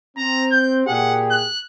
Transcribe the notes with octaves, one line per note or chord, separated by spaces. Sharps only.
C4 A#5
G6
A#2 G4 G#4 F#5
F#6